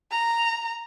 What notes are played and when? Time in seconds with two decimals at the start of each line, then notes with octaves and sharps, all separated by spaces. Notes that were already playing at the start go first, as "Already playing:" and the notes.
0.11 A#5